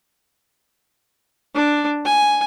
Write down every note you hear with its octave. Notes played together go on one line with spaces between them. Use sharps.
D4
G#5